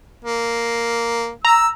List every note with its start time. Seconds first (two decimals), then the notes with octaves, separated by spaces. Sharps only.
0.25 A#3
1.45 A#5 E6